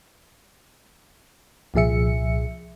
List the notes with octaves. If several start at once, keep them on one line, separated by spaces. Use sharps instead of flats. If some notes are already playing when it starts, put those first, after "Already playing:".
C2 A#2 F3 G#4 E5 C#7